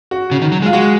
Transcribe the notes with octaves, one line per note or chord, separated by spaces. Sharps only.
F#4
C#3
D#3
F#3
G#3
F4
G#3 F#4